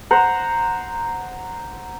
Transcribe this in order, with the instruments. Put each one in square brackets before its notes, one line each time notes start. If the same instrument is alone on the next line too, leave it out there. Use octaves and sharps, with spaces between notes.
[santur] C5 F#5 A#5